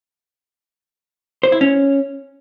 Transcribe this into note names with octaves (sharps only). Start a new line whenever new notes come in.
C5
E4
C#4